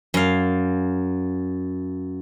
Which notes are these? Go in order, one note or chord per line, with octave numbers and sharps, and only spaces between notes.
F#2 F5